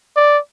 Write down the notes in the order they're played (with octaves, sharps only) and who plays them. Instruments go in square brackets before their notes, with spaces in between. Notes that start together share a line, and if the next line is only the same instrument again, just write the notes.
[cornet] D5